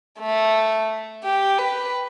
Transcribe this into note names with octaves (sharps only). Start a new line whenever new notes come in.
A3
G4
B4